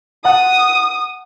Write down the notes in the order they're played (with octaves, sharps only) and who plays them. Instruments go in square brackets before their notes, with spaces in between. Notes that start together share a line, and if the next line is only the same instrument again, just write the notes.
[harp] F#5 A5 F#6 [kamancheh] D#6